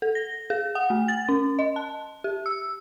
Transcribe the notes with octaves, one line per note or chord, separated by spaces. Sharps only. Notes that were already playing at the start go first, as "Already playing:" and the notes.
A4
A#6
G#4
F#5
A3
A6
C#4
D#5
A5
G4
E6